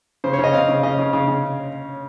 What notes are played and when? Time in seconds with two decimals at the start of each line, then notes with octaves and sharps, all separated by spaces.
0.24 C#3 C5
0.33 C#5
0.39 C#3 D#5
0.53 C4 F5
0.69 C#3
0.83 C#3 D#5
0.98 C#3
1.13 C#3
1.28 C#3